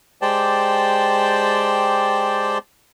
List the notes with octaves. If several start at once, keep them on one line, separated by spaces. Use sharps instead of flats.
G#3 G4 C5 D5 G5 A5